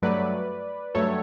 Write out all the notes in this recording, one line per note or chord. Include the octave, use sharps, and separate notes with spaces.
G2 F#3 A3 B4 D5
G2 F#3 A3 A4 C#5